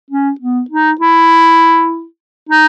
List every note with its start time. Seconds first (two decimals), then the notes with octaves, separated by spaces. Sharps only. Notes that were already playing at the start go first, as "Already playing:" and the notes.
0.11 C#4
0.41 B3
0.71 D#4
1.01 E4
2.49 D#4